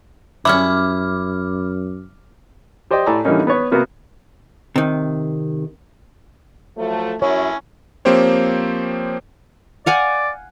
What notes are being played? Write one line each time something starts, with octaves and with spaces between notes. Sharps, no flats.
F#2 F#3 G3 C#4 E4 D6 F6
G4 C5 D5 D#5 G5
A2 A4 D5 G#5 A#5
D3 E3 G3 A#3 C#4 D#4
B3 B4 C#5
C3 A#3 B3 F#4 B4
C3 D#3
F3 F#3 A3
F#2 C#4 E4 C#5
F3 A#3 C4 G4 C5 C#5
D5 F5 F#5 G#5